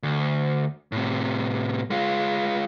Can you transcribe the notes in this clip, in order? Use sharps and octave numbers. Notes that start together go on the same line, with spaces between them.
D2
A2 C3
G#3 F4